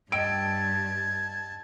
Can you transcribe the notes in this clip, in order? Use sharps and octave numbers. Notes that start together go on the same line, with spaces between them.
G2 D#5 G5 A5 E6 G#6 D7